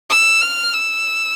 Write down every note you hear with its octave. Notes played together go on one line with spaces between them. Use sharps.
E6
F6
E6